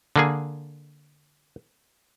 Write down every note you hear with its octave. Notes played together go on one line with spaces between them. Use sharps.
D3 A#3 G#4